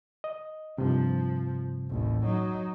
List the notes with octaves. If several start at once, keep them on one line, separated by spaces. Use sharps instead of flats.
D#5
G2 C3 F3
A1 D#2
F#3 D#4